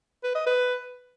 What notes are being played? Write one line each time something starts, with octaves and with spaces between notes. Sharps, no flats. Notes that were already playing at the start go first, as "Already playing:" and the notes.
B4
D#5
B4